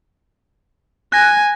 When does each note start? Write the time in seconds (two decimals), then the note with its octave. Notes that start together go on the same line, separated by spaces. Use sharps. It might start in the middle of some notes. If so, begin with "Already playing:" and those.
1.12 G#5 F#6 A#6